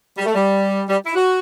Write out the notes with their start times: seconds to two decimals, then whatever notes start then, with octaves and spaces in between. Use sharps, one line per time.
0.18 G3
0.26 A3
0.34 G3
0.88 G3
1.05 E4
1.15 F#4